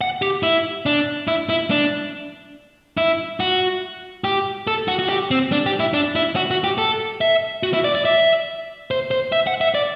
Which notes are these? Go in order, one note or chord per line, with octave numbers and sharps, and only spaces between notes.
F#5
G4
E4
D4
E4
E4
D4
E4
F#4
G4
A4
F#4
F#4
G4
C4
D4
G4
E4
D4
E4
F#4
F#4
G4
A4
E5
F#4
E4
D5
D5
E5
C5
C5
E5
F#5
E5
D5